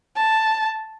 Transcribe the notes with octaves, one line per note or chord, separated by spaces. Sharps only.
A5